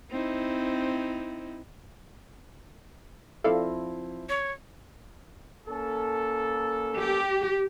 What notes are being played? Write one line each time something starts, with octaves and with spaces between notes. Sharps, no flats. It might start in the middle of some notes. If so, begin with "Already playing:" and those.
C4 D#4 E4
F3 C4 E4 A4 D5 F5
C#5
A#3 C#4 A4
G4